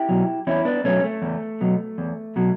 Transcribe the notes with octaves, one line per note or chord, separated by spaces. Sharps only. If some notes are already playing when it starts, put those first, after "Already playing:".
Already playing: E4 G4
B2 F#3
E2 C#4 E4
B3 D4
B2 F#3 A3 C#4
A3
E2
B2 F#3
E2
B2 F#3